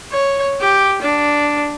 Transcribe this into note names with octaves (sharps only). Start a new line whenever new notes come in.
C#5
G4
D4